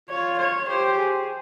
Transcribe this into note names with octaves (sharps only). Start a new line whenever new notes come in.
F4 C#5
C#5
G4 C5
G#4